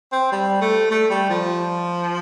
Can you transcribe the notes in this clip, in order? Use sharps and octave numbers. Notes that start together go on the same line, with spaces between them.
C4
G3
A3
A3
G3
F3